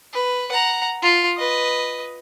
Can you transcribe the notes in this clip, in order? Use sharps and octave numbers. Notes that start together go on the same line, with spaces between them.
B4
F#5 A#5
F4
B4 D#5